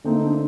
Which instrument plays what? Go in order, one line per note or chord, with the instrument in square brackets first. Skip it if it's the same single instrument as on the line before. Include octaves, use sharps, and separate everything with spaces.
[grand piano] D3 A3 C4 D#4 [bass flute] A#3
[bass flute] D4